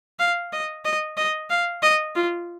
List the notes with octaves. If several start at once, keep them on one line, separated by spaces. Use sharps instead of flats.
F5
D#5
D#5
D#5
F5
D#5
F4